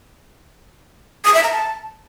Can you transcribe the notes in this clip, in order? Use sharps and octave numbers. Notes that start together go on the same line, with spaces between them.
D#6
E5
A#5
A5